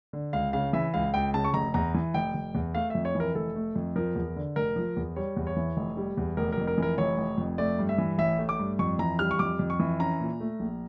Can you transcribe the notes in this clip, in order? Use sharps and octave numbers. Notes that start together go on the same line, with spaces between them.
D3
C#2 F5
C#3 F5
E3 E5
C#2 F5
C#2 G5
C#3 A5
C#6
F1 A#5
E2 A#5
E3
F1 G5
F1
E2
A3 F5
F2 E5
C#5
E3
A#4
F1 A4
A3
F2
F3 A#4
E2
D3
F1 A#4
F3
E2
G3 C#5
E2
C#5
E3
F1
G3
E2
F1 A#4
A#4
F2
A#4
E3 A#4
F1 C#5
F1
F2
A3 D5
G2
E5
E3
A1 E5
A3
D6
G2
F2 C#6
E3 A#5
G3 F6
C#6
F2 D6
F2
C#6
E3
C#4 A#5
A#2
A3
A#1